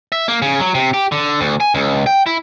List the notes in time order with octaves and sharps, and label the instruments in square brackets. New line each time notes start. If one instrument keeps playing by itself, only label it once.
[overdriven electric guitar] E5
A#3
C#3
F#3
C3
G4
D3
D2
G#5
C#2
G5
E4